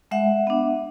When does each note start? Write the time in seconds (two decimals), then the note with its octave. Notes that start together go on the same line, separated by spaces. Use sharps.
0.11 G#3 E5 F#5
0.47 B3 D4